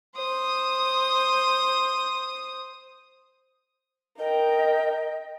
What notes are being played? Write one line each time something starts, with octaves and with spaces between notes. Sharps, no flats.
C5 D#6
A#4 D#5 G5